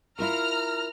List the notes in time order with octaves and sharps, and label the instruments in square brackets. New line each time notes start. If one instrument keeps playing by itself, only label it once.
[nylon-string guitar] E4 F4 A#4 [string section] A#5 F6